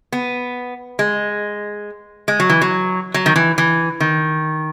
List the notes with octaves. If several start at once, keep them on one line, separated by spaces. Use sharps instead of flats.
B3
G#3
G#3
F#3
E3
F#3
F#3
D#3
E3
E3
D#3